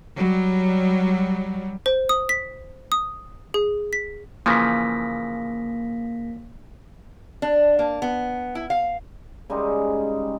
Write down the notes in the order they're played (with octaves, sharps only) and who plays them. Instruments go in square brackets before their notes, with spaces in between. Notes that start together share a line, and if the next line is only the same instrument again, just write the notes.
[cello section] F#3 G3
[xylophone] C5
D#6
B6
D#6
G#4
B6
[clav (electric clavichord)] C#3 E3 F3 [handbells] A#3 A#6 B6
[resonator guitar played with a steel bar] D4
A#3
B3
E4
F5
[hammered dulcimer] C#3 G3 G#3 D#4